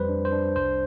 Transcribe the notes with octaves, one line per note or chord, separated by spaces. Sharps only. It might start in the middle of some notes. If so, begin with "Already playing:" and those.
Already playing: F2 G3 B4 C5
D4
C5
D4
C2 C5